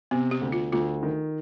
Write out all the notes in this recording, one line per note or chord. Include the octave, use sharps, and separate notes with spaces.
C3 B3
G4
D2
F4
D2 F4
D#3